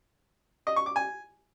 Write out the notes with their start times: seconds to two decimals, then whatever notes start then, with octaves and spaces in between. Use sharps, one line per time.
0.67 D#5
0.76 C#6
0.86 D6
0.96 G#5